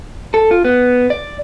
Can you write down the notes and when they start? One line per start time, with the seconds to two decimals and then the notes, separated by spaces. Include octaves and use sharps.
0.34 A4
0.51 F4
0.65 B3
1.10 D5